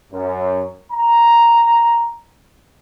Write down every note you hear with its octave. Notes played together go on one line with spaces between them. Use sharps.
F#2
A#5